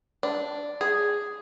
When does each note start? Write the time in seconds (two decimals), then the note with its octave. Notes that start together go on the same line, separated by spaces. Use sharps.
0.23 D4
0.81 G#4